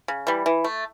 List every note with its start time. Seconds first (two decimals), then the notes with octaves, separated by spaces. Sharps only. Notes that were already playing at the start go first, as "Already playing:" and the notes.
0.08 C#3
0.27 E3 G3
0.46 E3
0.64 A3